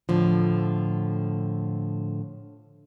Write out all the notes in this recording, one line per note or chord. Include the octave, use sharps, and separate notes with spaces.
A2 D3 F3